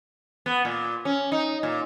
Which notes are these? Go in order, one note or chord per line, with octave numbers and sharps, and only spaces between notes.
B3
A#2
C#4
D#4
A#2